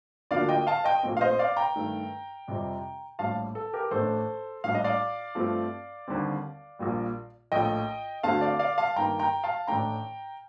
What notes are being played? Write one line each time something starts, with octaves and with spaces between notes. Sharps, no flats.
D2 D3 F3 A#3 D4 D5 F5
D#5 G5
F5 A5
D#5 G5
A#1 A#2 A3 C4
F5
C5 D#5
D5 F5
G5 A#5
G2 D#3 A3
F2 C3 G3 C4
A#1 A2 G3 F5 A5
A4
G4 A#4
A1 A2 A3 D4 A4 C5
A#1 A2 G3 D4 F5
D#5
D5 F5
G2 F3 A3 C4
D#2 D3 G3 C4
A#1 A#2 G3
A#1 A2 F3 A3 D#5 G5
D2 D3 A3 C4 F5 A5
D5 F5
D5 F5
F5 A5
G2 D#3 A#3 G5 A#5
G5 A#5
F5 A5
A1 A2 A3 D4 G5 A#5